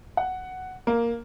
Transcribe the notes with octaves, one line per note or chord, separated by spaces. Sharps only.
F#5
A#3